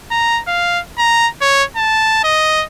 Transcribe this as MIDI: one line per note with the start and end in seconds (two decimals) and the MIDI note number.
0.11 0.41 82
0.47 0.80 77
0.98 1.28 82
1.41 1.64 73
1.77 2.23 81
2.24 2.64 75